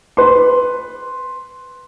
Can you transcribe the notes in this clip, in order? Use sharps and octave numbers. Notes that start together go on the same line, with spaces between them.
B4 C6